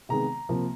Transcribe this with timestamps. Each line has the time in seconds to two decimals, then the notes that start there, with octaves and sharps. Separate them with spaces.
0.09 C3 D#3 G#3 B3 A#5
0.49 C3 F3 A#3